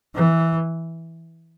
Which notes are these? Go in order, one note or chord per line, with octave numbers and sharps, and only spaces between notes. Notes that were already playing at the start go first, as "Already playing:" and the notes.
E3